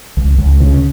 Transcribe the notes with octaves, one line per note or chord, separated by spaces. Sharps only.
C#2
C#2
C#3